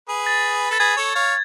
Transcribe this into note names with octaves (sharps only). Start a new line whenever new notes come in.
G#4 B4
A6
A4 A6
G#4 B4 G#6
A4 C#5
C#5 F5